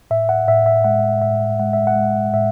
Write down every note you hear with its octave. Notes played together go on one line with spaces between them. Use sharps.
A2 E5
F#5
A2 E5
E5
G#3 F#5
A2 E5
G#3 F#5
E5
F#5
G#3
A2 E5